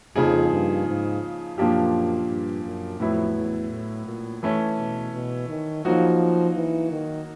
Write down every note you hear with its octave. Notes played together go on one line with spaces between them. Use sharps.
F2 C#3 F3 A#3 D#4 G#4
G2
G#2
F#2 A#2 F3 A#3 D4 G4
G2
F#2
F2 A2 F#3 B3 E4
E2
A2
A#2
E3 A3 C#4
B2
B2
D#3
F3 F#3 A#3 D#4 F#4
E3
D#3